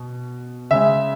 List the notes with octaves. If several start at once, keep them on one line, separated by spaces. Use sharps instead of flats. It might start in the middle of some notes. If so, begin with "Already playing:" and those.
Already playing: B2
C#3 G#3 E5